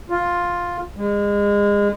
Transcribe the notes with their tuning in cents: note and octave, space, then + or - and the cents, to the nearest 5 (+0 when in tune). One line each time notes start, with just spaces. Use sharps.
F4 +10
G#3 -30